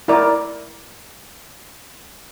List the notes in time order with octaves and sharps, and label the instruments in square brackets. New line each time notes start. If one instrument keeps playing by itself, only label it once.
[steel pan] E4 A#4 D5